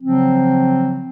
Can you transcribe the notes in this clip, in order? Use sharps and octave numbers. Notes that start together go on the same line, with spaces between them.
C#3 F3 F#3 C4